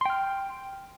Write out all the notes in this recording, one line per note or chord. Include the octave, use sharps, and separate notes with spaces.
G5 C6 F6